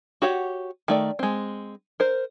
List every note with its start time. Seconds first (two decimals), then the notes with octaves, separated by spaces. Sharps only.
0.22 F#4 G4 C#5 F#5
0.88 D#3 A3 D5
1.19 G#3 C4
2.00 A#4 C5